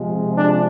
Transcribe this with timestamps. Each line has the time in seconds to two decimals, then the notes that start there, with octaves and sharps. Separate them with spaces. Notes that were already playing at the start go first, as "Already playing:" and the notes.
Already playing: C3 F3 G#3
0.37 D4